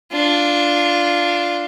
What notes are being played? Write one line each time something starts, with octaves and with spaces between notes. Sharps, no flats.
D4 F4